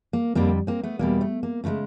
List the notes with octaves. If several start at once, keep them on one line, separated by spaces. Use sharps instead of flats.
A#3
F2 D3 G3 A#3 C4
A#3 C4
A3 B3
E2 B2 G3 A#3
A3
A#3
C#3 E3 G#3 A3